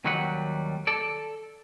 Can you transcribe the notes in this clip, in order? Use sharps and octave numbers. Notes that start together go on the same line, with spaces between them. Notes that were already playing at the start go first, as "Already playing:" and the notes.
D#2 D#3 F#3 G3 B4 F#5
A4 D5